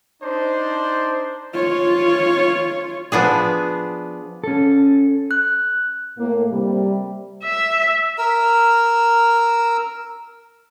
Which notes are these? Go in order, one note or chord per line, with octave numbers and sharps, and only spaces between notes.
D4 D#4 C5
F4 C#5
F3 B3 D4 G#4
C#4 A4
F#6
A2 A#3
C3 G3
E5
A#4 E6